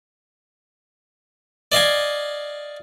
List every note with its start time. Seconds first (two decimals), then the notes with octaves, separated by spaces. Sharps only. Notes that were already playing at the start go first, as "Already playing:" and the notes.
1.72 D5 D#5 F5 G#5